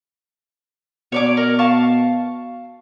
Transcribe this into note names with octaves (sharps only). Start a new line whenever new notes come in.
B2 C#5 D5 D6
A#4
F5 A5 C#6